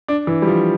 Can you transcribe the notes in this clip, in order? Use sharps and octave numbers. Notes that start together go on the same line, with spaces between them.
D4
E3
G3
F3